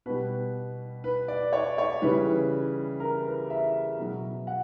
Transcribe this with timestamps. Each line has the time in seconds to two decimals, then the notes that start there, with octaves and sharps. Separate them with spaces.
0.06 B2 G3 B4
1.04 B4
1.28 D5
1.53 C#5
1.78 C#5
2.02 C#3 E3 G3 B4
3.00 A#4
3.25 B4
3.50 E5
3.98 B2 F#3
4.47 F#5